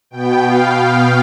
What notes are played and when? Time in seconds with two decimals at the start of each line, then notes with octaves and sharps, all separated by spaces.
0.11 B2 B3 G5
0.44 F5